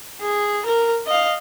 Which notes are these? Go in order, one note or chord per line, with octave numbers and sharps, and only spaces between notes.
G#4
A#4
D#5 F5